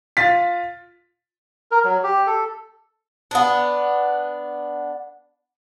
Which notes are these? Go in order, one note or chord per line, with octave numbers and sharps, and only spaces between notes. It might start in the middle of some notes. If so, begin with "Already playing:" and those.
F4 A6 B6
A#4
F#3
G4
A4
B3 D4